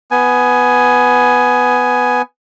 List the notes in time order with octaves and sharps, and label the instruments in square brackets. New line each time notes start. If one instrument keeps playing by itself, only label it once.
[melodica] B3 G#5